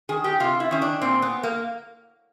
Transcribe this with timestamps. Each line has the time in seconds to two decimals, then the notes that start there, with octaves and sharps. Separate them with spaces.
0.09 D#3 G#4
0.24 G4
0.40 C3 F4
0.60 E4
0.71 D#3 C#4
0.82 D4
1.01 A#2 C4
1.22 B3
1.43 A#3